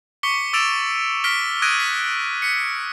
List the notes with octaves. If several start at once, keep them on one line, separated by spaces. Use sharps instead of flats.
C#6 D6 B6 C#7 G7
D6 E6 A6 D7 E7 F7
F6 A#6 B6 D7 G7
D#6 F#6 G#6 A#6 D7 D#7
B6
B6 C#7